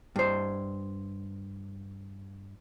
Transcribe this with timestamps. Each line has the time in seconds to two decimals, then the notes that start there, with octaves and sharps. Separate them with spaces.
0.16 G2 C5